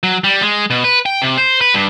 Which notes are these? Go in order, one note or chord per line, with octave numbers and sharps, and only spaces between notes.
F#3
G3
G#3
B2
B4
G5
C3
C5
B4
G2